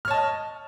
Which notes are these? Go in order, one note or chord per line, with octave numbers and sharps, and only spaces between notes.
C#5 D#5 A5 F6